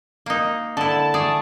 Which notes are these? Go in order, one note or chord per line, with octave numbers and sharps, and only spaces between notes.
A#3 D#4
D3 E4 A5
A3 G#4 D5